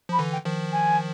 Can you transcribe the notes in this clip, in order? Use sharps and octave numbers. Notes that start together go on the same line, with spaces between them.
F3 B5
D3 E3
G5
D#3 F3
G#5